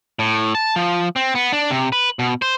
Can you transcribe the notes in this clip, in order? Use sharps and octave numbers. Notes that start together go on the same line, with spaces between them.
A2
A5
F3
C4
B3
D4
C3
B4
B2
C5